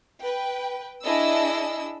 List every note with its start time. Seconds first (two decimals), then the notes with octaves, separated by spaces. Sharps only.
0.22 B4 G5
1.02 D4 E4 G#4 D#5 E6